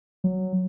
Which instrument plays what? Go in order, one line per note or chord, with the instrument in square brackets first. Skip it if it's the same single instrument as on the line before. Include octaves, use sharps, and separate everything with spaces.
[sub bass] F#3